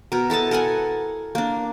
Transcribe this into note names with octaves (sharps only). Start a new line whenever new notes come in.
B2 A#4
E4 A4 D#5 A5
A4 A#4 F#5 G#5
A#3 D4